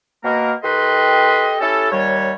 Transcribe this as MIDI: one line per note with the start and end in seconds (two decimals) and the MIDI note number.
0.25 0.53 47
0.25 0.53 58
0.25 0.53 70
0.64 1.56 51
0.64 1.56 67
0.64 1.56 69
0.64 1.56 71
0.64 1.56 75
0.64 1.56 84
1.60 1.88 61
1.60 1.88 64
1.60 1.88 67
1.60 1.88 69
1.92 2.33 39
1.92 2.33 55
1.92 2.33 73